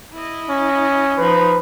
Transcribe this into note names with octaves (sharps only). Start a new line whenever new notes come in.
E4 D#5
C#4
F3 D#4 B4